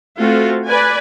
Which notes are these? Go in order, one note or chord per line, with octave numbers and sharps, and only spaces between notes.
A3 C4 F4 F#4
B4 D5 G#5